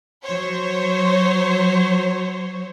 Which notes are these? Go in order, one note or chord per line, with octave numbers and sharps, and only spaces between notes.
F#3 C5 C#5